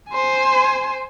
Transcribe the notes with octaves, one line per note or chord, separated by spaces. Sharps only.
C5 G#5